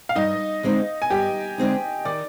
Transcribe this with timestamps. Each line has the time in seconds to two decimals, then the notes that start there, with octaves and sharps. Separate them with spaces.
0.09 F5
0.15 G2 D#4 D#5
0.63 D3 G#3 C4 D#4
1.02 G#5
1.10 G2 G4 G5
1.58 D3 G#3 C4 D#4
2.05 D#3 D5 D6